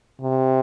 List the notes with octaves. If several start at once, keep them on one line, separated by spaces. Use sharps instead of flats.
C3